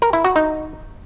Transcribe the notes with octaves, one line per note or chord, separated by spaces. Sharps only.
A#4
E4
F#4
D#4